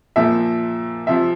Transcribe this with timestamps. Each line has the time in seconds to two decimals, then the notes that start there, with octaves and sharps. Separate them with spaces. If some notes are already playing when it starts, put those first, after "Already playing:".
0.16 A#2 F3 E5
1.07 C3 F3 E5